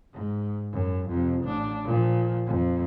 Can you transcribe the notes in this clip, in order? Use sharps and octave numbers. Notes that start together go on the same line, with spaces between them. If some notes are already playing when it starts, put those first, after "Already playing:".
G#2
F#2
F2 C3
A1 D4
A#2 F3
F2